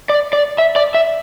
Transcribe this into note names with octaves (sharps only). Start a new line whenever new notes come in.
D5
D5
E5
D5
E5